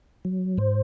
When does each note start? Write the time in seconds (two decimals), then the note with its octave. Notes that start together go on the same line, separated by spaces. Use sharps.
0.25 F#3
0.58 G#2 C5